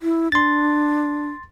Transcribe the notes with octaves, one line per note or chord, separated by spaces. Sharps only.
E4
D4 C6 A6